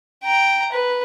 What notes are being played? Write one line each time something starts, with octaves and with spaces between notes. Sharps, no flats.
G5 A#5
B4